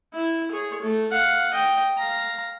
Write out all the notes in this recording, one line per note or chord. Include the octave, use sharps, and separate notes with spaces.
E4
G#4 C#5
A3
F5 F#5
D#5 G5
F5 A#5